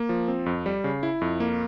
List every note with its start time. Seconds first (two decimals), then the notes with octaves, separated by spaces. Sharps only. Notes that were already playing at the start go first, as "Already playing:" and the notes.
Already playing: A#3
0.09 F3
0.28 C4
0.46 F2
0.66 G3
0.84 C#3
1.03 E4
1.21 F2
1.40 A#3